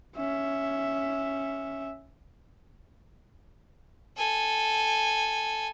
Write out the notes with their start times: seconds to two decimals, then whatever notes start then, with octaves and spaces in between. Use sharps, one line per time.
0.16 C#4 E5
4.17 A4 G#5